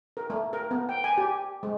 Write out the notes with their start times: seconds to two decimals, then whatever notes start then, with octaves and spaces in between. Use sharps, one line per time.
0.17 A#4
0.30 A3
0.53 A#4
0.71 B3
0.89 G5
1.04 G#5
1.18 G4
1.63 G#3